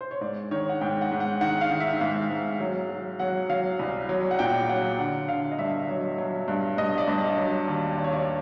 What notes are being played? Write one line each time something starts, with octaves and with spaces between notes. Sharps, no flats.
C5
C#5
G#2 D5
D#3 C#5
F#5
G#2 G5
F#5
G#2
F#5
D#3 F#5
F5
D#3
E5
G#2 F5
G#2
F#3
F#3
F#3 F#5
F#3 F5
C2
F#3
F#5
A#2 G5
F#3 F#5
D3 F#5
D3 F5
D#5
G2 E5
F#3
F#3
G2
G2 D#5
D5
G2
D5
F#3
D#2
D#2 D5
C#5
D5